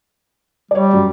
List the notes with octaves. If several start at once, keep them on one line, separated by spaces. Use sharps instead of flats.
G3 C#5 D5
F#2